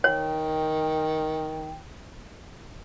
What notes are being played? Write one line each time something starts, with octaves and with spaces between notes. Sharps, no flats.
D#3 C#5 G5